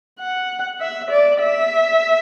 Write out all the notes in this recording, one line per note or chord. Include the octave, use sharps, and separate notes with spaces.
F#5
E5
D5
E5